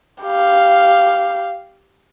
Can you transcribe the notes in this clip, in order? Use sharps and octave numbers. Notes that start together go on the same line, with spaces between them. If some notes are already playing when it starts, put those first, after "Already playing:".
G4 F5